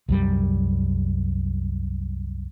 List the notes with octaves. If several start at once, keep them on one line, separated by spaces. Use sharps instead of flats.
C2 F#2 G3